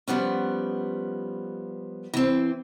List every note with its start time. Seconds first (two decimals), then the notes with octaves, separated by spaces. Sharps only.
0.08 F3 G3 B3 C#4
2.14 E3 C4